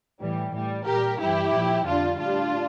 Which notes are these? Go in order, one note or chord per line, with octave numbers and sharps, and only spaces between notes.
A2 E3 G3
A2 G3
A#2 G3 G4 A#4
G2 E3 G3 E4 G4
A#2 F3
F2 D3 G3 D4 F4
A2 G3 D4 F4